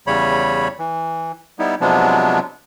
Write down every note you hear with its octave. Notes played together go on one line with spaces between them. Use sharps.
E2 C#3 G3 C#5 B5
E3
G3 B3 D#4 E4
C3 F3 F#3 G#3 B3 D4